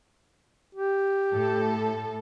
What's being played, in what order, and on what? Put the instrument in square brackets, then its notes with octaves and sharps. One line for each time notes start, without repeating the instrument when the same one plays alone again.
[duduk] G4
[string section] A2 A4